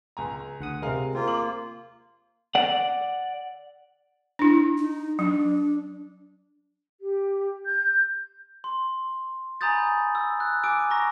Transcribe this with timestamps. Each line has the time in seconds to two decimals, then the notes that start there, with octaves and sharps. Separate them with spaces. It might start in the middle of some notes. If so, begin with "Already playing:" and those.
0.17 C#2 G#5 A#5
0.60 D2 F#5 D#6
0.82 C3 G#3 A#4 F5
1.15 A#3 C4 F4
1.28 D6 F#7
2.55 D5 F#5
4.39 D4 E4
4.78 D#4
5.19 F#3 D4
7.00 G4
7.65 G6
8.64 C6
9.61 G#5 A#5 B5 D#6 G6 A6
10.15 E6
10.40 F#6
10.64 G#5 D6 E6 D7
10.90 A#5 C#6 A#6